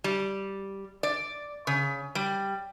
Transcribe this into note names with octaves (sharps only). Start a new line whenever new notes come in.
G3
D5
C#3
G3